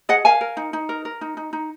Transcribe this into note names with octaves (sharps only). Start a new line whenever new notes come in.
G#4 D#5 F#5
A#4 F5 G#5
A#4
D#4
D#4
A#4
A#4
D#4
D#4
D#4